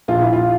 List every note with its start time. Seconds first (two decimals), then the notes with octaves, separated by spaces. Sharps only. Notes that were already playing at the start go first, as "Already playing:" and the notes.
0.08 A#1 F4
0.21 E4
0.33 F4